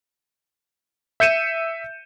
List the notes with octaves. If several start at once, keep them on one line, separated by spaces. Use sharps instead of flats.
E5 G6 C#7 D#7 E7